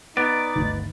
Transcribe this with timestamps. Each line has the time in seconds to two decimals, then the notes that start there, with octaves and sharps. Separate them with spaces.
0.17 B3 D#4 D5
0.56 G1 D2 D#3